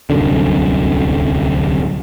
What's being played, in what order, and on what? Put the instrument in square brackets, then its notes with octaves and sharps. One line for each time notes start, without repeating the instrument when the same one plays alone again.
[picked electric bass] D1 C2 F#2 D3